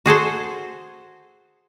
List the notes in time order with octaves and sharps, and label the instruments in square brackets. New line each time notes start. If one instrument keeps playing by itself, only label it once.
[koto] F#4 G#4 A4 C5